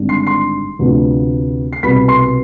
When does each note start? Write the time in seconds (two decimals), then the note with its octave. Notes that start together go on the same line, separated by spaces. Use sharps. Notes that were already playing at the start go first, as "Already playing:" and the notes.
Already playing: G#1 G2 D3
0.09 C6 C7
0.27 C6 C7
0.79 D2 C3 F3 B3
1.73 C7
1.83 C2 B2 B3 B5 B6
2.08 C6 C7